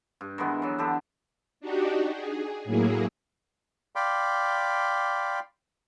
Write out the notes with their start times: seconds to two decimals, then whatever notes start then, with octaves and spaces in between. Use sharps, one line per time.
0.21 G2
0.38 D#3 E3 G#3 B3
0.62 E3 F#3
0.79 D3 D4 G4 A4
1.60 D4 D#4 F#4 G4
2.10 G#4
2.64 A2 F#3 A#3 E4 G#4
3.96 D5 F5 G5 B5 C6 D6